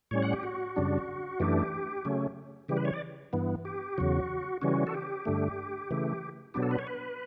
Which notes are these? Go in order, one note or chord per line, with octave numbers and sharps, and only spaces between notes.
A2 G3 C#4 C#5
F#5
G4
F#4
F#2 C#3 G3 D4
F#2 E3 A3 D4 G4
C#3 F#3 A3 C#4
C#3 E3 G3 G4
B4
C#5
D5
G2 E3 B3
G4
E2 C#3 F#3 F#4
C#3 E3 G3 C#4 F#4
A4
G4
G2 D3 A3
C#3 E3 A3
B2 F#3 B3 D4 G4
A4
B4
C#5
B4